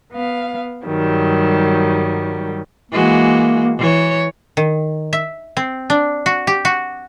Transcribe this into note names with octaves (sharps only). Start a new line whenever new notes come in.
B3 F5
G2 D#3 F#3 G3
E3 G#3 A#3 F#4
E3 C#5
D#3
E5
C4
D4
F#4
G4
F#4